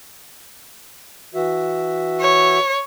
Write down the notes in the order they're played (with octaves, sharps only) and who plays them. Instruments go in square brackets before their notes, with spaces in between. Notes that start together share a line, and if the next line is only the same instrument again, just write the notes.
[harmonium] E3 F#4 E5
[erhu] C#5